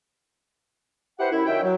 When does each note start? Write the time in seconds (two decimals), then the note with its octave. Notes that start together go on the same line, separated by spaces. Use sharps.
1.19 E4 G4 B4 C5 F#5
1.31 F#2 E4
1.46 F#2 D#3 C#4 E5 G5
1.62 F#3